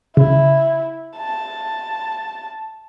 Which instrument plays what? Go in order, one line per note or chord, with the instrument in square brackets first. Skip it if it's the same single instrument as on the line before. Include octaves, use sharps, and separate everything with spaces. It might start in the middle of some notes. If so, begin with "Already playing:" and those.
[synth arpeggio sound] C#3 [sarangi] E4
[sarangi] A5